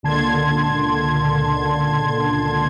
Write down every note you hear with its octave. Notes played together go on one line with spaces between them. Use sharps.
C#2 A#2 D3 A5 C6 G#6